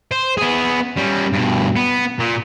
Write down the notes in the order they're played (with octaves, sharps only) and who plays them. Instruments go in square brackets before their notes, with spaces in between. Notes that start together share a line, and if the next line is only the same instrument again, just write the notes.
[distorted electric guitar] C5
B3 G#4
G3 C#4
G2 B2
B3
A#2